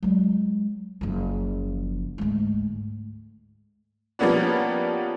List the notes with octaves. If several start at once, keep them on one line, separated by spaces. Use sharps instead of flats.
F#3 G#3
F#1 F3
D2 G#2
F3 G3 A#3 B3 C#4 D4